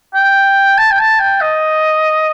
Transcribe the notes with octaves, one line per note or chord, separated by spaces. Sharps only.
G5
A5
G5
A5
G5
D#5